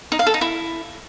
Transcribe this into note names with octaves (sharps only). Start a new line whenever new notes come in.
D#4
F5
A4
D#4
E4